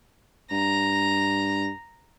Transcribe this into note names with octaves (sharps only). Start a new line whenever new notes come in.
G2 A#5